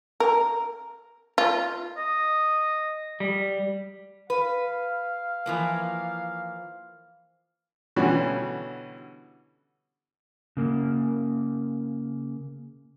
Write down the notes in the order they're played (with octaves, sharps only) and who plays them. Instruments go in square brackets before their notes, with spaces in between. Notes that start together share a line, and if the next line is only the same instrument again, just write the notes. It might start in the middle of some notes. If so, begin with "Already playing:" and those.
[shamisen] A#4
F4
[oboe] D#5
[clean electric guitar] G3
[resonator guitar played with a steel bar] B4 [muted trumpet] F5
[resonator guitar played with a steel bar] E3 F3 A#3
[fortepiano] B2 D3 E3 G3 C#4 F#4
[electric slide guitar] C#3 A#3